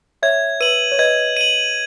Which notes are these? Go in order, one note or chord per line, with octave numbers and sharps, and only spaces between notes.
C#5 E5 G#6
B4 D#7 F#7
C#5
B4 D#5 G#6
D#7 F#7